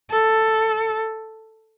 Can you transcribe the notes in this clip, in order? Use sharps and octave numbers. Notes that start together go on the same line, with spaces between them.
A4